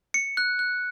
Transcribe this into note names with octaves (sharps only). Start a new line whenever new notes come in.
C#7
F#6
F#6